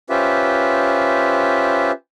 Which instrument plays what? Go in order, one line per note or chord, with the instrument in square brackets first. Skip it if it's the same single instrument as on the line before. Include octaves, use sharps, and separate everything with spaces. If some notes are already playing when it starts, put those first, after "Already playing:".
[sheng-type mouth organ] C#4 F4 G4 B4 C5 E5